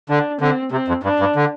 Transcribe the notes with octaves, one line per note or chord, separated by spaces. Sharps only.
D3 D4
D3 C4
C3 C4
F2
G2 D4
G2
D3